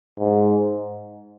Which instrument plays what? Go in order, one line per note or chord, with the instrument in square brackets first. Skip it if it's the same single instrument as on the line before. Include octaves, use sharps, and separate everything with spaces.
[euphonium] G#2